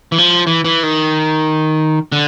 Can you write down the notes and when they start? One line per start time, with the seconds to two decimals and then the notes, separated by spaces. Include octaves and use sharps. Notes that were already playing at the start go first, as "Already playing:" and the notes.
0.12 E3
0.18 F3
0.47 E3
0.65 E3
0.83 D#3
2.12 D3